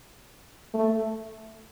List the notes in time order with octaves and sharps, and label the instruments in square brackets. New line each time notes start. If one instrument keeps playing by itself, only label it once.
[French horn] A3